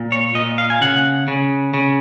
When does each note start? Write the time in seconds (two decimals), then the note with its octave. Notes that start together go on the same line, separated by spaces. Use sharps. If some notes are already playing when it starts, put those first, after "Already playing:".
Already playing: A#2
0.12 C#5
0.35 A#2 D#5
0.58 F5
0.70 G#5
0.81 C#3 F#5
1.28 C#3
1.74 C#3